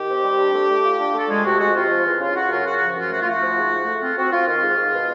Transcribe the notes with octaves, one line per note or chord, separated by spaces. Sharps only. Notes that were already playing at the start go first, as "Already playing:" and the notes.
Already playing: D#3 G4
C4
G3
D4
A3
A3
F4
D4
A3 A4
F3 G#3 G#4
C3 F#4
G#3 F#4
C3 F4
F3
E2
C#3 F4
C#3 F#4
F#2 F4
C#3 F#4
F3 F#4
F#2 F4
A3 F#4
F4
A3 F#4
F3
G#2
A3
A3
C4 F4
C4 F#4
C4 F4
D#3 F4
G#2
G#2
B2